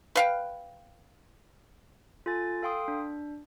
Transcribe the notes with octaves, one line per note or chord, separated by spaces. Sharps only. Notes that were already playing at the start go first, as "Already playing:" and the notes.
B4 F5 G5
F4 A4 G#5 A6
A4 F5 G5 C6 D#6
D4